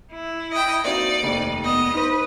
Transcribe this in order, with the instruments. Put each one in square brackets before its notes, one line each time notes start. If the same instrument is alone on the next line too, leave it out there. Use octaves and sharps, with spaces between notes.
[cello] E4
[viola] D#5 G5
[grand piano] A#3 C4 F#4 [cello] D#4 [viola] D5
[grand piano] F1 D#2 C#7 [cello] D#4
[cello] B3 [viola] D#5
[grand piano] D#4 C5 [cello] B4